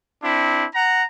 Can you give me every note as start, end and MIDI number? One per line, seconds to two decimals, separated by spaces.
0.24 0.66 60
0.24 0.66 62
0.24 0.66 64
0.75 1.04 78
0.75 1.04 82